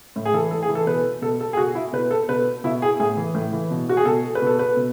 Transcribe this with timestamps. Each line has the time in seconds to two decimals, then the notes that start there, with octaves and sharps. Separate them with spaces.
0.16 A2
0.25 G#4
0.33 E3 A4
0.51 A2 A4
0.63 G#4
0.69 E3
0.75 A4
0.87 B2 B4
1.22 B2 A4
1.41 A4
1.53 G#4
1.57 B2 F#4
1.75 E4
1.92 B2 B4
2.11 A4
2.28 B2 B4
2.64 B2 E4
2.82 G#4
2.99 A2 G#4
3.17 E3
3.34 A2
3.52 E3
3.71 B2
3.89 F#4
3.97 G#4
4.05 B2 A4
4.35 B4
4.42 B2
4.47 A4
4.59 B4
4.77 B2